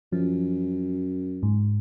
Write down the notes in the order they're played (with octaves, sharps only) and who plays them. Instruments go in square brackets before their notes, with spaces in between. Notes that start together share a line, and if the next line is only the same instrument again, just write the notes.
[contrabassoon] F#2 [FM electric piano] F3
[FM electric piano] G#2